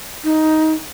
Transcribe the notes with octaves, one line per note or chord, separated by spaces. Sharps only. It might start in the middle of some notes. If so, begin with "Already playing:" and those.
D#4